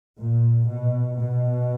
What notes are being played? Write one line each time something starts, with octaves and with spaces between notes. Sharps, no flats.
A#2
B2
B2